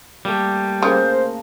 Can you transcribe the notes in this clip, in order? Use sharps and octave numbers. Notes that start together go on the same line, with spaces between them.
G3 A3 A#3
C#3 A3 A#3 A#4 C5 A#5